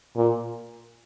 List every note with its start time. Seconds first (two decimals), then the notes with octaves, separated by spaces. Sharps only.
0.17 A#2